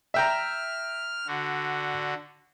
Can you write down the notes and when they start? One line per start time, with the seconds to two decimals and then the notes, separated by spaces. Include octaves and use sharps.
0.14 E5 G5 A#5 F6
1.27 D3 F#4